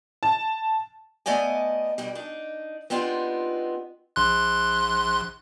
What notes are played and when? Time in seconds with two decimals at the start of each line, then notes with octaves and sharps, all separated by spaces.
0.23 A5
1.26 A3 B3 D5 D#5 G#5
1.98 G2 B2 G3
2.15 D4 D#4
2.90 B3 C4 D4 D#4 F4 G4
4.16 A#1 C6 F#6